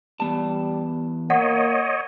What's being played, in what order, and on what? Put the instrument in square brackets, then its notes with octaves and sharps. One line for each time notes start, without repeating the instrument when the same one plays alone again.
[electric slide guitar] E2 B3 A5 [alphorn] G3
[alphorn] A#3 [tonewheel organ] C#5 D#5 [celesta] F#5